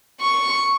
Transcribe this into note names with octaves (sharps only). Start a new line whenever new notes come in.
C#6